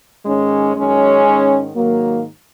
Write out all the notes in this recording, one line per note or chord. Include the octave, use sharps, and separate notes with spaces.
G#2 D#3 G#3 C#4
F#2 D#3 G#3 C#4
G#2 D#3
G#2 D#3 F#3 A#3